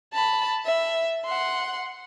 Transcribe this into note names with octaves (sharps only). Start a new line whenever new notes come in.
A5 B5
E5
F#5 C6